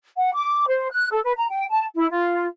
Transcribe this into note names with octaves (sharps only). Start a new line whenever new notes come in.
F#5
D6
C5
F#6
A4
B4
A#5
G5
A5
E4
F4